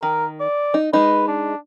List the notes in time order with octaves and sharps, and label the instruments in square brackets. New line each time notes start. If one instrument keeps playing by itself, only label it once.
[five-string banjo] D#3 [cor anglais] A#4
[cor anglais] D5
[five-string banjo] D#4
[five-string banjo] G#3 D#4 [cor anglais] B4
[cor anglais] D4